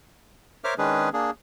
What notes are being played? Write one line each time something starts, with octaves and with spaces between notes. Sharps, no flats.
A#4 C5 C#5 E5 D6 F6
D#3 G#3 C#4 D4 G#4 B4
A#3 D4 G#4